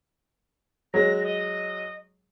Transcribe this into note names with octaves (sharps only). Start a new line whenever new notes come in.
F#3 G#3 A#6
D#5